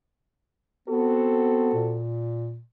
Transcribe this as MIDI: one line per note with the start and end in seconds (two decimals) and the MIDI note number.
0.88 1.69 59
0.88 1.99 60
0.88 1.99 66
0.88 1.99 69
1.74 2.61 46